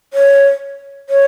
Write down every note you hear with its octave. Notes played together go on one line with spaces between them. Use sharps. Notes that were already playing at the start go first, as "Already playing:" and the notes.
C#5
C#5